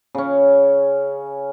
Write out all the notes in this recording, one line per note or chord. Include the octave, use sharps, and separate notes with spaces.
C#3 C#4